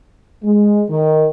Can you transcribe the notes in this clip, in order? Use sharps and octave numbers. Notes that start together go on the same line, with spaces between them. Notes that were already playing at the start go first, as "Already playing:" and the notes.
G#3
D#3